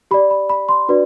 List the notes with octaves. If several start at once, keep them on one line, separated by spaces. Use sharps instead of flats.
G4 D5 B5
B5
B5
C6
D4 F#4 B4 D5